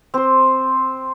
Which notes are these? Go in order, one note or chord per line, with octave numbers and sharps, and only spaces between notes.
C4 C5